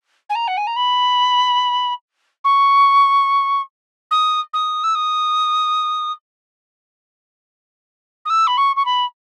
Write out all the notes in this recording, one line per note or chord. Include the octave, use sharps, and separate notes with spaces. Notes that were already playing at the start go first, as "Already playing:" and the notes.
G#5
A#5
F#5
G#5
A#5
B5
C#6
D#6
D#6
E6
D#6
D#6
E6
B5
C#6
C#6
B5